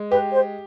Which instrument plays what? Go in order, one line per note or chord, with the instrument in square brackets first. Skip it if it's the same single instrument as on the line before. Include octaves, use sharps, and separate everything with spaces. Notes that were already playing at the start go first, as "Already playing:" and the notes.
Already playing: [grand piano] G#3
[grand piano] G4 [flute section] B4
[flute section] C5